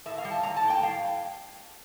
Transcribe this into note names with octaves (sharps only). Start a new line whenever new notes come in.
A2 E5
F5
G3
A5
A#3 A#5
A5
A2
G5
G3 F5